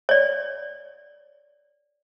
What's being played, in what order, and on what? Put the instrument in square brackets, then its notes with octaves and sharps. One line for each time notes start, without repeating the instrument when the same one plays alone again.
[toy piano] C#5 D5